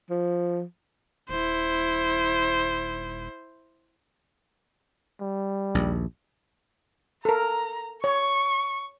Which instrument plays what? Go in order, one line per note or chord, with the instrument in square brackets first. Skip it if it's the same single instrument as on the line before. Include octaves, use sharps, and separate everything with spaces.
[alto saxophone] F3
[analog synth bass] D#1 [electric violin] E4 C5
[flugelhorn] G3
[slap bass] A#1 D#2
[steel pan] A4 A#4 [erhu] A#5
[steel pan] C#5 [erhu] C#6